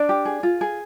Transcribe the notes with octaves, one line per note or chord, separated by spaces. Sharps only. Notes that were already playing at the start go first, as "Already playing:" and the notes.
Already playing: D4 D5
G4
G#4
F4
G#4